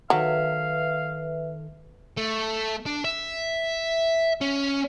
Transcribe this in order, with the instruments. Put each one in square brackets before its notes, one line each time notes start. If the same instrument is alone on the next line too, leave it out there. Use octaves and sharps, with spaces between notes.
[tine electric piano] D#3 A4 [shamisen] F#3 [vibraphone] B4 E5 [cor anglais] F5
[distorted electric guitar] A3
D4
E5
C#4